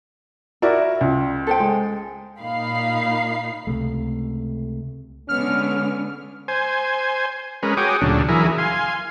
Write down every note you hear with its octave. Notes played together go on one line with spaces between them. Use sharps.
E4 F#4 A#4 D5
C#2
A4 C5 G5
G#3
A#2 A#3 D#4 F5 B5 C7
C#2 C3 A3
D3 G#3 B3 C#4 F6
C5 G#5
G#3 C#4 A#4 B4
F#4 G#4 C#5 G5 D6 D#6
D2 A#2 C#3 F#3 D4
E3 F#3 E4 G#4 A#4
F5 G#5 C6